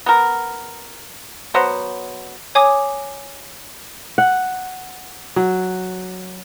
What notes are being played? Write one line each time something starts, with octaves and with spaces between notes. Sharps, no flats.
B3 A#4
F#3 B3 C5
C#5 G#5 D6 D#6 G#6
F#5
F#3